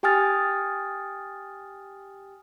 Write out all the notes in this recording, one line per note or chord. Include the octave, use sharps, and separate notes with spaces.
G4 G5 G#5 D#6 F6 A6